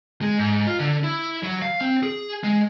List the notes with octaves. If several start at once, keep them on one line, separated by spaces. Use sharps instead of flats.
G#3
G#2
F4
D3
E4
F#3
F5
C4
G#4
G#3